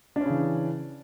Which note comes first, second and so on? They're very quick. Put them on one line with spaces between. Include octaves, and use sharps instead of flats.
D4 C#4 C#3 E3